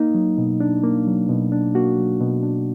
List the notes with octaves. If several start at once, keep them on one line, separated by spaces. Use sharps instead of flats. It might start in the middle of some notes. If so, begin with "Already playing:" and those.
Already playing: A#3 D#4
F#3
B2
D4
A#3
F#3
B2
D4
A#3 F#4
F#3
B2
D4